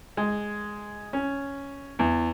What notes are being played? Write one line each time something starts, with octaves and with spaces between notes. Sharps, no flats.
G#3
C#4
E2